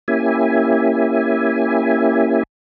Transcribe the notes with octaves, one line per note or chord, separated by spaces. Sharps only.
A#3 C#4 E4 G4 E5 G#5